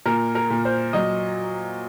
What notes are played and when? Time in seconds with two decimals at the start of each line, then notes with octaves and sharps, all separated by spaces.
0.06 A#2 A#4
0.35 A#4
0.50 A#2
0.65 C5
0.93 F#3 D#5